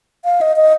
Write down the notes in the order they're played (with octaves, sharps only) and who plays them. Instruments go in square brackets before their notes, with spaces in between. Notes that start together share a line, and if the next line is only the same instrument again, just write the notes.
[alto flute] F5
D#5
D#5